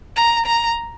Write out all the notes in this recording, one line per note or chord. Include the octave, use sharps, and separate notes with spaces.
A#5
A#5